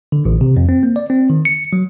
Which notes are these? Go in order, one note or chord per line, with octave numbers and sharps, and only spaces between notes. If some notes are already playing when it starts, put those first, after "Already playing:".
D3
A1
C3
F2
C4
A#3
D5
C4
D#3
C#7
F#3